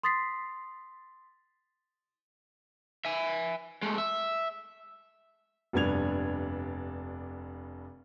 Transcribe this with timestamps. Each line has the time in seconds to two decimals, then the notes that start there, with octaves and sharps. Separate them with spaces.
0.03 C6 D#6 A6 B6 C7
3.05 E5 G#5
3.83 G#3 A3
3.98 E5
5.73 F1 G2 B3 D4 G#6 F7